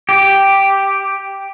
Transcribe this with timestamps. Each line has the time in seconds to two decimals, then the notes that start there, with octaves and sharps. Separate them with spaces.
0.09 G4